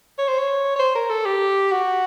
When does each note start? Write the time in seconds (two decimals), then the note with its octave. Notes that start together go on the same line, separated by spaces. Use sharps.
0.19 C#5
0.28 C5
0.39 C#5
0.76 C#5
0.79 C5
0.95 A#4
1.10 A4
1.25 G4
1.72 F#4